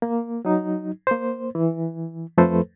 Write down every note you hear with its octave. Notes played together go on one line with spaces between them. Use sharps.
A#3
F#3 D#4
A#3 C5
E3
F2 F3 A3 A4 B4 C5